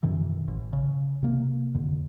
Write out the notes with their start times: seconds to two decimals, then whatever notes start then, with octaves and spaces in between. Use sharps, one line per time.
0.03 F#2 B2 D#3 E3
0.48 A1
0.73 C#3
1.23 C3 A#3
1.75 F2 D3